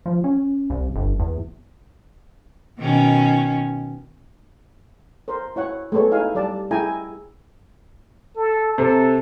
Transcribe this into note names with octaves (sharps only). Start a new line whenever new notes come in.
F3
C#4
C2
G1
E2
B2 D#3 C#4
A#4 C5
E4 C#5 F#5
G#3 A3 B3 A4 C#5
D#4 E4 F5 G#5
G3 D5 A5
E4 G#4 G5 G#5 A#5
A4
C3 A4